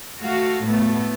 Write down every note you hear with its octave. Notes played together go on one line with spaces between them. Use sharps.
A3 F#4 F5
A2 A3 B3